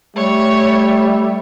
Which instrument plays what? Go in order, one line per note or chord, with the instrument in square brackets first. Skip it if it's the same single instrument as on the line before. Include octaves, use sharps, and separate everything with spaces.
[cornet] G3 [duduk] A3 [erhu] C#5